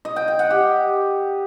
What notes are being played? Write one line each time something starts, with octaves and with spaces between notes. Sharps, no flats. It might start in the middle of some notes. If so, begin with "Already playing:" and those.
D#5
G5
G5
F#5
G4